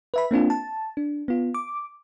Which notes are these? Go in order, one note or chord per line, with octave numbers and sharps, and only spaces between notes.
B4 E5 B5
A#3 C4 D4 F4
A5
D4
B3 F4
D6